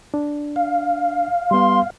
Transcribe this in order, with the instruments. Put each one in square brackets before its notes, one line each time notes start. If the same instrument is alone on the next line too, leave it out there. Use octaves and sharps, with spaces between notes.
[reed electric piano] D4
[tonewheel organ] F5
[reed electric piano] G3 B3 [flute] C6